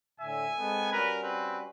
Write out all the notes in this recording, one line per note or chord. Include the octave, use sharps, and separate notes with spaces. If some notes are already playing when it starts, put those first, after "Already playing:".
A2 D3 E5 G#5
G#3 B3 C4 A4
G3 C#4 F#4 A#4 B4
C4 B4